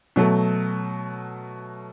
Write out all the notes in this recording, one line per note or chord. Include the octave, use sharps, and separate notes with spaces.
B2 F#3 A3